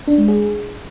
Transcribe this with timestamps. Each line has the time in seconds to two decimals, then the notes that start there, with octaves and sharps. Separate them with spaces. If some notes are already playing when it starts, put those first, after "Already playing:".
0.08 D4
0.18 G#3
0.28 G#4